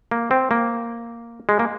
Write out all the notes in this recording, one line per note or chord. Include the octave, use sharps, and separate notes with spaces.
A#3
C4
A#3
G#3
A#3